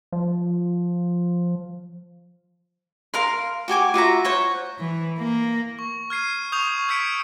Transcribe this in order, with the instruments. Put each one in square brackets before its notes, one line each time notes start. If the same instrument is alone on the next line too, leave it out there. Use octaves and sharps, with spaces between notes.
[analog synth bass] F3
[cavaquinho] A#4 F5 C6
F#4 G4 G#5 D6
F4 F#4 E5 A#5
C5 C#5 F#5
[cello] E3
A#3
[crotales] C#6
F6 G#6 C7 D#7
C#6 D#6 G6 F7
E6 G6 G#6 B6 C#7 D7